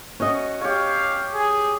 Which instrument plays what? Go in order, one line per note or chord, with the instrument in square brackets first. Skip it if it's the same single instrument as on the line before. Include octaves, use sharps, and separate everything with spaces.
[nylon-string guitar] C#4 D#5 [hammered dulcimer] F#4
[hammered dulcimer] G4 C#5 [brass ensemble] F5
[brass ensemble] G#4